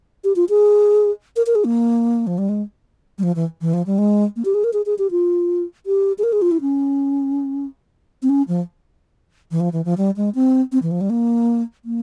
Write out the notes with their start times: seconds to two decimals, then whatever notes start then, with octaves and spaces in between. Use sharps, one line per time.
0.24 G4
0.36 F4
0.49 G#4
1.36 A#4
1.46 A#4
1.55 G#4
1.64 A#3
2.27 F3
2.38 G3
2.49 G#3
3.18 G3
3.23 F3
3.35 E3
3.61 E3
3.73 F3
3.86 G3
3.98 G#3
4.36 A#3
4.45 G4
4.54 G#4
4.64 A#4
4.73 G#4
4.86 G#4
4.98 G4
5.11 F4
5.86 G4
6.18 G#4
6.23 A#4
6.33 G#4
6.42 F4
6.51 E4
6.61 C#4
8.22 C4
8.29 C#4
8.48 F3
9.51 E3
9.60 F3
9.73 E3
9.85 F3
9.97 G3
10.16 G#3
10.35 C4
10.72 C4
10.82 E3
10.91 F3
11.01 G3
11.10 A#3
11.85 A#3